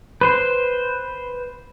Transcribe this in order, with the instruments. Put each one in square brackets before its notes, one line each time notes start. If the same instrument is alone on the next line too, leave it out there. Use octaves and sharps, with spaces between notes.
[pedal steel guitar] B4 C5 C6